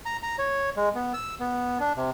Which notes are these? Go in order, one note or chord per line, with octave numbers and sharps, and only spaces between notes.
A#5
A#5
C#5
G#3
B3
E6
B3
D4
C3